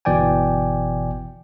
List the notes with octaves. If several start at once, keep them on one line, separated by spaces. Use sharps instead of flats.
G1 B2 E3 D5 G5 G#5